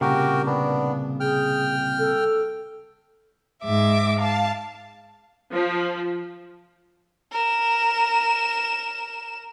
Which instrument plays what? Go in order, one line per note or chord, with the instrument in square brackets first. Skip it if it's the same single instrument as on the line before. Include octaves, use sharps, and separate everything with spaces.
[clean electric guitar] C2 A#2 C#3 [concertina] F#4 G4 A#4
[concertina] B3 D4
[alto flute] G#4 [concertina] G5 F6
[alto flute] A4
[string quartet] G#2 E5 D6
F5 A5
[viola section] F3
[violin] A#4 E7